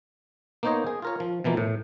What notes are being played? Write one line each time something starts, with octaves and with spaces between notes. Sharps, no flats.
A#3 B3 D#4 C5 C#5 D#5
G#4
F4 A#4 C#5
F3
B2 E3 F3 A#3
A2